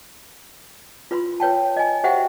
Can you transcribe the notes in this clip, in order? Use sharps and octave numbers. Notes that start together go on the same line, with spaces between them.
F4 B4 B5 C6
B4 C#5 G5 A5
D#5 G#5
F#4 G4 C5 E5 F#5 G5